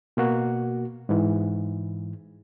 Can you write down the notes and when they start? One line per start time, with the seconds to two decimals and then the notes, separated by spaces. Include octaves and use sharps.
0.17 B2 A#3 F#4
1.09 G#2 E3